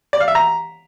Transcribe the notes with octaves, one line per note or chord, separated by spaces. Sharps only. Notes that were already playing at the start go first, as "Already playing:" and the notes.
D5
F5
E5
A#5